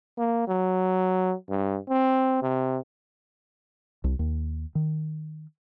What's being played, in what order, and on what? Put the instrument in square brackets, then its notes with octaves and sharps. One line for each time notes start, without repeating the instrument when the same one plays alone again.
[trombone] A#3
F#3
G2
C4
C3
[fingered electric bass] C2
D#2
D#3